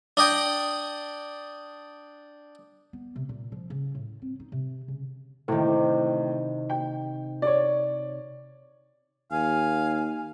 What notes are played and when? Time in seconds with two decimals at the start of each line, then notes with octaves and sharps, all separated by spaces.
0.17 D4 D#5 G5
2.93 B3
3.16 C3
3.29 A#2
3.52 F3
3.70 C#3
3.95 A2
4.22 C4
4.40 D#4
4.52 C3
4.88 C#3
5.48 A2 C3 D#3
6.70 G5
7.42 C#5 D5
9.32 D#2 F5 G#5